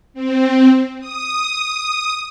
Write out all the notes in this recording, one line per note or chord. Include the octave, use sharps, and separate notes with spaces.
C4
D#6